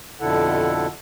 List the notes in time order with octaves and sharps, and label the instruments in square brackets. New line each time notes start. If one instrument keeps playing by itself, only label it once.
[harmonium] F2 B2 D3 E4 A4 F#5